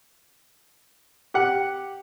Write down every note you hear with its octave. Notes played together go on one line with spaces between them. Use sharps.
G4 F#5